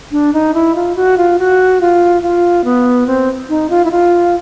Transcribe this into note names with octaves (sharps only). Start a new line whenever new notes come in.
D4
D#4
E4
F4
F#4
F4
F#4
F4
F4
B3
C4
D#4
F4
E4
F4